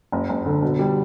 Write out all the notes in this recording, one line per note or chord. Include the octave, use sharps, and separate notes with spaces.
F#1
F#1
D3
B2
G3